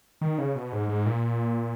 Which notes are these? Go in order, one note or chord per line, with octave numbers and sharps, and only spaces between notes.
D#3
C#3
B2
G#2
G#2
A#2